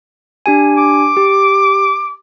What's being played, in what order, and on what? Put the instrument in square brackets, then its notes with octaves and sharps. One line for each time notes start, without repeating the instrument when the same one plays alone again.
[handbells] D4 G4 G#5
[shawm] D6
[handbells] G4